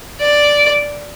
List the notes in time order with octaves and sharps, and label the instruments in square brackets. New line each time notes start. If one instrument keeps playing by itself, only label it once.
[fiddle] D5